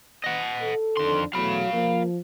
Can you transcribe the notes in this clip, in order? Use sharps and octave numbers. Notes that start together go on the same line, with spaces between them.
D#5 F#5
A4
F2 D3 D#3 D4 C6
E2 F#3 A3 F5 B5
F3 A#3